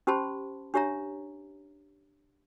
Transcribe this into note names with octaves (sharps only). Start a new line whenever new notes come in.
C#4 G4 C5 A5 B5 C6
D4 G4 C#5 E5 A#5